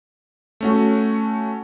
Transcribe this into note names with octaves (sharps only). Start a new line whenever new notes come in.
A3 C#4 F#4